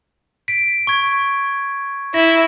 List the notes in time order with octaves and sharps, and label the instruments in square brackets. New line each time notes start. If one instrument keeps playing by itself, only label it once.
[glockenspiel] B6 D7
C#6 G#6
[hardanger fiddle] E4 [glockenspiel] A#6